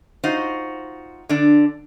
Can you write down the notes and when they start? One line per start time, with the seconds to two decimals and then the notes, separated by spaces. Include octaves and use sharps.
0.24 D#4 F4 F#4 C5
1.29 D3 D4